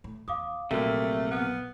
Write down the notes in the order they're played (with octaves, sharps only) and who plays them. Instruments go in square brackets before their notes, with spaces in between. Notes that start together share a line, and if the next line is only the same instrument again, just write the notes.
[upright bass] A2
[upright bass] E2 [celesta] F5 D6 D#6
[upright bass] A#1 F#3 [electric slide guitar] C3 A#3 [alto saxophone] A3 [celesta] F#4 A#4 B6
[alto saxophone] B3 [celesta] F6 F#6